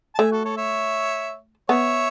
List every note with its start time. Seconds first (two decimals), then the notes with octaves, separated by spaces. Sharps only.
0.15 A5
0.19 A3 E5 G#5
0.31 F#4 A4
0.45 A4 C#5
0.57 C#5 E5
1.69 B3 C#5 E5